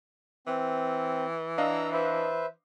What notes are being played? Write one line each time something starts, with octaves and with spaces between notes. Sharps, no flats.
E3 C4
D4 D#5 F5 A#5 E6
B4 C5 E5